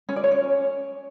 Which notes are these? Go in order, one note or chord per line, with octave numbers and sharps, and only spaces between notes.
C#4
D5
C#5
C#4